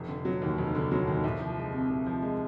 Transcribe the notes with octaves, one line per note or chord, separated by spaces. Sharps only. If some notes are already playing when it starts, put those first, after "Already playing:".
Already playing: F1
D3
F#3
D#2
F1
D3
F#3
D#2
C2
F3
G#3
C3
C2
F3
G#3